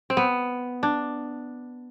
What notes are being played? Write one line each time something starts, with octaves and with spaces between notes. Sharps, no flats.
C4
B3
D4